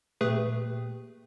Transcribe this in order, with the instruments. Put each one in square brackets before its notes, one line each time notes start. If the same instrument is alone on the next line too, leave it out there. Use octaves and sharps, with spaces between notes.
[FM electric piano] A#2 G4 [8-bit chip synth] A3 G#4 B4